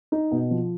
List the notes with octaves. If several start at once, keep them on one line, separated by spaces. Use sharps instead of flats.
D#4
B2
F3